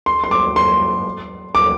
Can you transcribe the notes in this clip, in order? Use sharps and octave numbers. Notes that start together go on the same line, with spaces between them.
C6
C6
D6
C6
D6